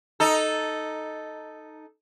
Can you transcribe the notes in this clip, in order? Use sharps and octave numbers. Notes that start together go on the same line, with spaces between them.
D#4 A4